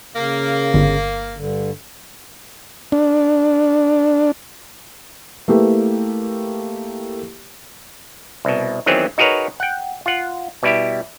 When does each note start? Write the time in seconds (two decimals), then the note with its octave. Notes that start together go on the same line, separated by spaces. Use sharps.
0.15 C#3 A#3
0.74 G1
1.37 G2 D3
2.92 D4
5.48 A3 A#3 E4 G4 B4
8.45 C2 B2
8.86 D#3 E3 F#3 B3 C4 G#4
9.18 D#4 F#4 G#4 A#4 B4 C#5
9.60 F#5 G5
10.06 F4 F#5
10.63 B2 G3 E4 G4